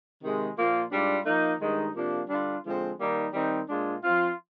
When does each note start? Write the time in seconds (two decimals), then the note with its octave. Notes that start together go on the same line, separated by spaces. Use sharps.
0.22 C3 D#3 G#3
0.56 A#2 F3 A#3 F4
0.91 G#2 G3 D4 F4
1.26 F3 A#3 D#4
1.61 G2 D#3 G#3 D#4
1.95 C3 F3 A#3 D4
2.29 D3 G3 D4 F4
2.64 D3 F3 G#3 C4
3.00 D#3 G3 A#3 D#4
3.33 D#3 G3 C4 D#4
3.69 A#2 G#3 D4 F4
4.04 F3 C4 F4